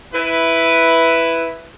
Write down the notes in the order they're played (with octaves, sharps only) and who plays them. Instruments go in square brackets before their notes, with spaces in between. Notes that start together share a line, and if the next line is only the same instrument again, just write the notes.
[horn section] E4 B4